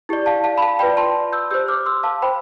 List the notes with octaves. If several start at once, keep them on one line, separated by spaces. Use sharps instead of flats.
E4 G4 D5
F5 A5
F5 A5
B5
F5 A5
F4 B4 D5 G5 B5
A5 C6
E6 G6
G4 C5 E6 G6
D6 F6
C6 E6
F5 A5
C5 G5 B5